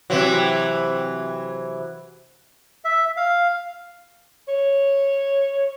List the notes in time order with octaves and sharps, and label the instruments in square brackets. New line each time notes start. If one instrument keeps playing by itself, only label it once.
[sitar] C3 E3 F#3
[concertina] E5
F5
[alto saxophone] C#5